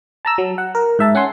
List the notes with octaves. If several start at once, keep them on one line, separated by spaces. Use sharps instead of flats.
A5 A#5 E6
F#3
F#5
A#4
G#2 E5 A5
C#4 F#5 G#5 C6